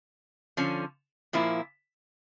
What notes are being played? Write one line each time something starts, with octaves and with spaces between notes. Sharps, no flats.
D3 F3 C#4
A#2 F3 A#3 E4